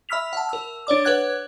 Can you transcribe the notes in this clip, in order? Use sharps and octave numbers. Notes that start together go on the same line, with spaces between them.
E5 B5 E6 F6 B6 F7
F#5 A5
A#4 E6
D4 C#5 D5 D6
B4 C#5 F#5 F#6 G#6